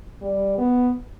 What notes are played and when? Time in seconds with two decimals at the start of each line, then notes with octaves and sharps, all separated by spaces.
0.22 G3
0.58 B3